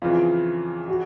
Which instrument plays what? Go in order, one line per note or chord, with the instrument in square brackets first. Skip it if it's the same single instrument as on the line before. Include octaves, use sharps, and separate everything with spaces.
[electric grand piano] F2 C#3 E3 [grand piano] F4
[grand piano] F#4